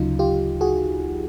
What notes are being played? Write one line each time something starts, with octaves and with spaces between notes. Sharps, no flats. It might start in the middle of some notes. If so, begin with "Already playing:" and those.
Already playing: D2 C#3 F#3 D#4 F4
F4 G4
F#4 G#4